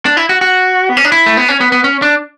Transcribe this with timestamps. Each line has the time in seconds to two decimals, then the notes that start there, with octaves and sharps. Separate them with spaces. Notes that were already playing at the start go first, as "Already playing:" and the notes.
0.06 D4
0.17 E4
0.29 F#4
0.41 F#4
0.89 B3
0.97 C#4
1.05 D4
1.12 E4
1.26 A3
1.37 B3
1.48 C#4
1.61 B3
1.72 B3
1.84 C#4
2.02 D4